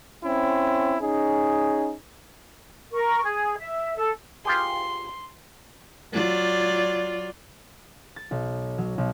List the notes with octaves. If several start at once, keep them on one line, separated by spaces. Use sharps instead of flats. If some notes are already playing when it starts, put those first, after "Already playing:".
C4 C#4 E4
C#4 D#4 G#4
A#4 C#6
G#4
E5
A4
F4 G4 G#4 C6
F#3 F4 D5
A6
B1
F#3
B1